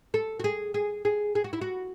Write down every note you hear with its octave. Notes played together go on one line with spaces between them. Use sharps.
A4
F#4
G#4
G#4
G#4
G#4
F#4
E4
F#4